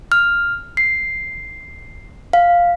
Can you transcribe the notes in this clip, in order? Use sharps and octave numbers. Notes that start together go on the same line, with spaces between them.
F6
C7
F5